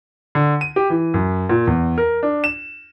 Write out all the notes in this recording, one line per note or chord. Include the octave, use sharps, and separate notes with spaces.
D3
D#7
G4
E3
F#2
A#2
E2
A#4
D4
E7